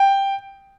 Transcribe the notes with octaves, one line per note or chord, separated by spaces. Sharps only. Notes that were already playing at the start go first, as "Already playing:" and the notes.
Already playing: G5